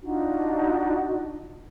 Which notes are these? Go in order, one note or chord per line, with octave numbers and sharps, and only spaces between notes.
D4 D#4 F4 F#4